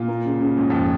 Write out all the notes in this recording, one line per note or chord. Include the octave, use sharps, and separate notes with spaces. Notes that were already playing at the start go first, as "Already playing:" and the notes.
Already playing: A#2 F4
A#3
C#3
C#3
G#2 C#4
F2 C#4